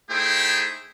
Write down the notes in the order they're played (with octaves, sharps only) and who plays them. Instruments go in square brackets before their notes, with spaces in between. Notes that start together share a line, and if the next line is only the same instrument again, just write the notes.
[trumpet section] A3 D#4 E4 G#4 C5 G5